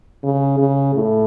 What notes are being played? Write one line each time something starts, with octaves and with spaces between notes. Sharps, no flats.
C#3
C#3
A2